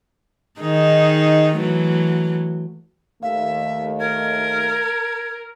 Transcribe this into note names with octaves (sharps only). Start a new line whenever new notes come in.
D#3 D#4 G#4
E3 F#3 A3
D#2 A3 E5 F5
A#4 G#6